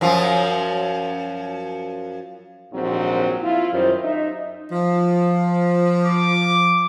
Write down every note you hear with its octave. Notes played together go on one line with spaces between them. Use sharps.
F#2 F3 F4
A#1 D#2 G#2 F#3 C4
E4 F4
F#2 D#3 G3 C5
D#4 E5
F3
D6